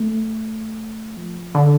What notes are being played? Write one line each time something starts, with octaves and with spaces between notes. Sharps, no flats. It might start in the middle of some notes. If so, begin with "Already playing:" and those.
Already playing: A3
F3
D3